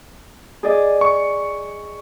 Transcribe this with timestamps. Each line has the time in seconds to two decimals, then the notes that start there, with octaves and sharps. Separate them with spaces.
0.63 G#4 D5 D#5
1.01 C#6